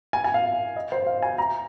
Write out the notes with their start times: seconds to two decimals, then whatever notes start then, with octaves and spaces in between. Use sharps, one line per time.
0.13 G#5
0.24 G#5
0.34 F5
0.76 D#5
0.92 C5
1.07 F5
1.22 G#5
1.38 A#5